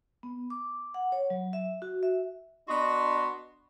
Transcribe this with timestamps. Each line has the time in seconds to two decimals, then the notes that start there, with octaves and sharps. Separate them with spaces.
0.23 B3
0.50 D6
0.94 F#5
1.12 C#5
1.30 F#3
1.53 E5
1.82 F#4
2.03 E5
2.68 B3 D4 F#4 D#5 C6